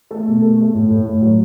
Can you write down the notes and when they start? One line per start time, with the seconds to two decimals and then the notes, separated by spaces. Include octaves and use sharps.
0.11 A3 A4
0.27 B2
0.42 A3
0.58 A3
0.74 A2
0.90 A2
1.06 A2
1.22 F#3